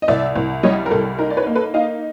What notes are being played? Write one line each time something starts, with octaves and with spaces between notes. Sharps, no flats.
D#5
C2 D5 E5
C2
G3 C#5 D#5
A#4
C2 A4
D#4 A#4
D5
B4 C#5
A#3
A4 B4
D#4 D#5 F5